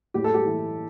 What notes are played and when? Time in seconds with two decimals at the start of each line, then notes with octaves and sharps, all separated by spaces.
0.14 A2 G4
0.24 A4
0.34 G4
0.46 E3